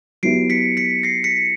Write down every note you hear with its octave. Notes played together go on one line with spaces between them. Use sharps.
F#3 B3 E4 G4 C7 D7
B6 C#7
B6 C#7
A#6 C7
B6 C#7